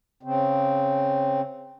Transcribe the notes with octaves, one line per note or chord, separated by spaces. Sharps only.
C#3 C4